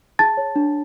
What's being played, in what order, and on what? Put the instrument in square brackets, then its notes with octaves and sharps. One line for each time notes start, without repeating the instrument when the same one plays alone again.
[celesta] G#4 A5 A6
C#5
D4